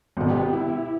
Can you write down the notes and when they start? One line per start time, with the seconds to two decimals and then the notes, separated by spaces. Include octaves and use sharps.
0.17 G#1 B2
0.30 B3 G4
0.53 E4